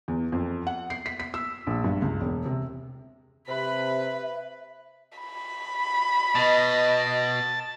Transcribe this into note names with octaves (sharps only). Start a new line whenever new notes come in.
E2
F2
F#5
C7
B6
B6
E6
A#1
G2
C#2
E1
C3
C3 B4 E5 B5
B5
B2 D#5 A5